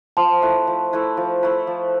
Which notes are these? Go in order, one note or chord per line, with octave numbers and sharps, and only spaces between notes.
F3 A5 C6
A3 E4 B4
F3
A3 E4 B4
F3
A3 E4 B4
F3